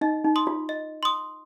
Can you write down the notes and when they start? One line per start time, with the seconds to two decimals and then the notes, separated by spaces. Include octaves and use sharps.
0.01 D#4 D#5
0.24 D#4
0.36 C6 D#6
0.47 F4
0.69 D#5
1.03 C6 D#6